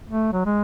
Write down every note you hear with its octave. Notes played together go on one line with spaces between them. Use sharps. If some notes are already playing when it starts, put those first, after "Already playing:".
A3
F#3
G#3